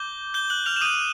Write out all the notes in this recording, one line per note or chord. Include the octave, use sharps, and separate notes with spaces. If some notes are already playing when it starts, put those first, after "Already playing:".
Already playing: D6 G6 G7
G6 G7
F#6 F#7
F6 F7
E7
D#6 G6 D#7